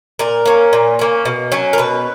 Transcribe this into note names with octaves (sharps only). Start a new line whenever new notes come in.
A#2 A#4
A#3 C#4
A#2
A#3 C#4
B2
F#3 C#4
A#4
B2 B4